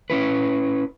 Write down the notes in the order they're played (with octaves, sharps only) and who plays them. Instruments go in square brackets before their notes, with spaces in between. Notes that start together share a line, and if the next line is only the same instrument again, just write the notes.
[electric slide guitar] C#4 E4 B4